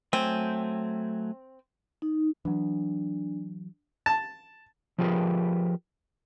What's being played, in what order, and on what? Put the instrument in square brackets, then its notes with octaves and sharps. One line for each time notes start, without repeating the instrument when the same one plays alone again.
[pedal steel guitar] F#3 A3 G#5 [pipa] C4
[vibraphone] D#4
[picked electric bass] E3 F#3 [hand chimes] D4
[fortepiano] A5
[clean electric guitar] F3 F4 G4 G#4 A#4 B4